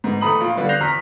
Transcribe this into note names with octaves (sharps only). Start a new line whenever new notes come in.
G#2 B3
E2 A3 A#5 B5 D#6 F#7
A#1 F4
D3 G3 B3 F4
F#6 G6 A#6 C7 F7
E2 A#5 F6 B6